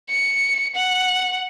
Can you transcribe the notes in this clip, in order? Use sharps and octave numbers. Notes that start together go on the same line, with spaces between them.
C#7
F#5